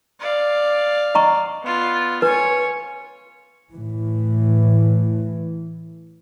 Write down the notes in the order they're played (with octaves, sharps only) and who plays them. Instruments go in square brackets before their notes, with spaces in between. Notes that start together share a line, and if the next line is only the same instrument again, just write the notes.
[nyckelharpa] D5 F5
[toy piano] D#5 A#5 C#6
[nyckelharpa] B3 F4
[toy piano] B4 [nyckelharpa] C#5 G#5
[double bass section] A2 E3